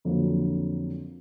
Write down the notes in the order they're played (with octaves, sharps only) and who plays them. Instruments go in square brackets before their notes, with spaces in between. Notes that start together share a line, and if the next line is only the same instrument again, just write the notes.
[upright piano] F2 D3 F#3 A#3